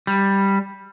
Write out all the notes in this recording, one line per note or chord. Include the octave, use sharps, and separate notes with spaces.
G3